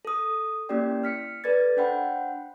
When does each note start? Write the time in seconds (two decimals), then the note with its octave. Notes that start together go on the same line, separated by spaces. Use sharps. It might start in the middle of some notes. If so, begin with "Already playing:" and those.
0.05 A4 D#6
0.69 A#3 C#4 E4 G4 D5 G5
1.03 F6 B6 C#7
1.44 A4 B4 D5 G#6 A6
1.77 D4 C5 F#5 G5 B5